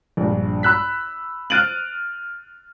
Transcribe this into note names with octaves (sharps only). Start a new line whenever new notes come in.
A#1 G2
B5 E6 F#6 B6
F6 F#6 A6 D7 D#7 F#7